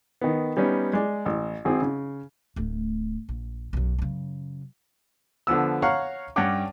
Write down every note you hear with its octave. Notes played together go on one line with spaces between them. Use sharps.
D#3 B3
G3 B3 C#4 D#4
G#3 D5
A1
G#1 C4 G#4
C#3
D1 A3
A#1
B1 F#2
F#2 C#3
D3 F3 B3 E6
C#5 F5 F#5 A#5 C#6
G2 C#4 C#5 F#5 G5 D6